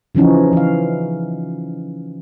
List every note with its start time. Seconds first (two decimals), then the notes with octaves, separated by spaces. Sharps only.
0.15 C#3 E3 F3 C#4 D#4
0.53 E3 F5